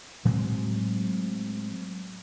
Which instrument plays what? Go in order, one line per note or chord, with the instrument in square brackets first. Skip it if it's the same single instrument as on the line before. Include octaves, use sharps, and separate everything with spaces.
[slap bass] A2 F#3 G#3 C4